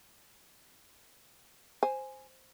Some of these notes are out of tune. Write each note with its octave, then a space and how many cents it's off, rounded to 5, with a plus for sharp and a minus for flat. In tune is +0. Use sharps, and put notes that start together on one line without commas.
C5 +0 G#5 +0